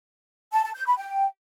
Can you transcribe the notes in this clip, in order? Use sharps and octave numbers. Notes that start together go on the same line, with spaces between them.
A5
A5
G6
B5
G5